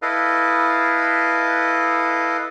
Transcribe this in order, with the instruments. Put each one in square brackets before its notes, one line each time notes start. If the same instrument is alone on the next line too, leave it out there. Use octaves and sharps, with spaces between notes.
[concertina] E4 A4 B4 D#5 F5